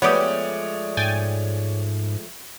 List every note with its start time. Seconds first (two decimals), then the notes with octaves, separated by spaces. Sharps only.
0.02 F3 G#3 A3 B3 G4 C#5 D5 D#6
0.97 G#2 G5 G#5 A6